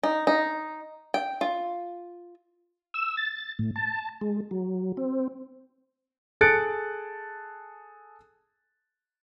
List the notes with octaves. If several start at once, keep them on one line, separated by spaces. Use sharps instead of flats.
D#4
D#4
G5
F4
E6
A6
A2
A5
G#3
F#3
C4
G#4 A4 F#6 A6 C#7 D7